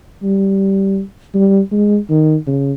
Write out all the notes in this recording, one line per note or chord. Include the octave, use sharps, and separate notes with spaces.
G3
G3
G#3
D#3
C#3